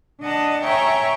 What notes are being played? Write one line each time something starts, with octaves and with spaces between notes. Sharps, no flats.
D4 D#5 F#5 A5
C#5 E5 G5 G#5 A#5 C#6